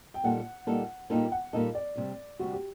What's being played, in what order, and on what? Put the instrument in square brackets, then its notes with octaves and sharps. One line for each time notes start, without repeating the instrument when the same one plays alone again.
[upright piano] G5
[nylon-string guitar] A#2 G3 A#3 D#4 A4 [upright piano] F#5
[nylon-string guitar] A#2 G3 A#3 D#4 A4
[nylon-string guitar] A#2 G3 A#3 D#4 A4 [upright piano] G5
[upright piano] F#5
[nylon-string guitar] A#2 G3 A#3 D#4 A4 [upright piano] D#5
[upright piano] D5
[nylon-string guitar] D2 C3 G3
[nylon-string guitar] D2 C3 G3 [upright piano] F#4
[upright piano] G4